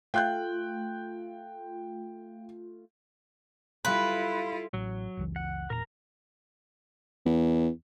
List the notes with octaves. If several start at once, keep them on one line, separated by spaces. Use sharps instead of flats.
A3 F4 G5 F#6 G6
G3 E4 F4 A4 B4 F5 B5 C6
A1 F#3
F#1 C#2 E3
F#5
E1 A#2 A#4 A#5
E2